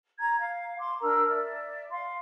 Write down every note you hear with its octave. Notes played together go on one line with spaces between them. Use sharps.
A#5 G#6
F5
C6 D6
D4 A#4 A#5 E6
D5 E5
F5 C6